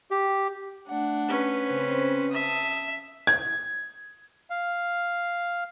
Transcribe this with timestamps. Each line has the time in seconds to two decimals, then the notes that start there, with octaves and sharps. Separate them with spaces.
0.11 G4
0.87 A3 D4 F#5
1.28 C#4 B4
1.67 C#3 C4 C5
2.32 E5 A5 D#6
3.27 G#6
4.50 F5